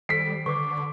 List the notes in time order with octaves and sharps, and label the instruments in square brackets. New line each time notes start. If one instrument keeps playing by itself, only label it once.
[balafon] D#3 A4 [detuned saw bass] G3 [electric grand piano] B6 C7 [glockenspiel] D7
[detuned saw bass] D3 [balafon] B4 [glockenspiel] C#6 D6